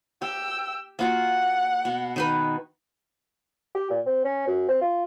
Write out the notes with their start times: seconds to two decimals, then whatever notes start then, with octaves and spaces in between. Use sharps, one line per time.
0.22 G4 G5 E6
0.99 A#3 F4 F#4 F#5
1.85 B2
2.16 D#3 D#4 B4
3.75 G4
3.90 A#2
4.06 C4
4.24 C#4
4.47 F#2
4.68 C4
4.81 F4